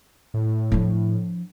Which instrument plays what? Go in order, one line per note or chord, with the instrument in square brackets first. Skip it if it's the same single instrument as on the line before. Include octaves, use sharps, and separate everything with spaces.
[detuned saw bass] A2
[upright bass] F3 D4